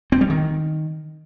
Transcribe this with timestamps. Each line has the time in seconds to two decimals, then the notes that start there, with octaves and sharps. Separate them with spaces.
0.12 C4
0.21 G3
0.30 D#3